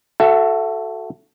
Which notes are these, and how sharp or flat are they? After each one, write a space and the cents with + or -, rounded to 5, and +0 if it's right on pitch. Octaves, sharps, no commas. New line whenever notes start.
F#4 +0 A4 +0 E5 +30